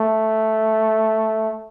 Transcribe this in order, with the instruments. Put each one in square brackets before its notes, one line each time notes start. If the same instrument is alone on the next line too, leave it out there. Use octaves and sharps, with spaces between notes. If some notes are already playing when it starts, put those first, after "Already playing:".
Already playing: [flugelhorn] A3